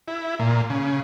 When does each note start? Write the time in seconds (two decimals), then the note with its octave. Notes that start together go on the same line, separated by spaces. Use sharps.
0.08 E4
0.39 A#2
0.70 C#3